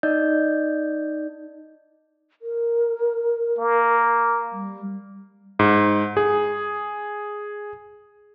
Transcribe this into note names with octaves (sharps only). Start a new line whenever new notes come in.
D#4 D5 D#5 G6
A#4
A#3
G3
G#2
G#4